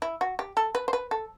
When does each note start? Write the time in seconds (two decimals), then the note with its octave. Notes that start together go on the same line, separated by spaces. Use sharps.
0.02 E4
0.21 F#4
0.39 G4
0.57 A4
0.75 B4
0.88 C5
0.93 B4
1.11 A4